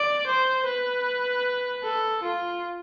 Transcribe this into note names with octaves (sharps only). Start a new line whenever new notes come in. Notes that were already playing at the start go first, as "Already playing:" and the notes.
Already playing: D5
C5
B4
A4
F4